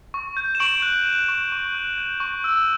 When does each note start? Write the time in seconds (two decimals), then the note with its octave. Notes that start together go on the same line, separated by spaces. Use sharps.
0.14 C#6
0.37 G6
0.55 E7
0.60 C#6 D7 F#7
0.82 F#6
1.06 F#6
1.28 C#6
1.52 C#6
1.75 F#6
1.98 G6
2.20 C#6
2.44 E6